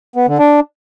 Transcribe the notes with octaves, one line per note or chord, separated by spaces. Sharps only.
B3
D3
D4